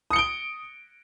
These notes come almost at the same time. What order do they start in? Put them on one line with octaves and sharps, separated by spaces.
D#6 C#7 G7 D7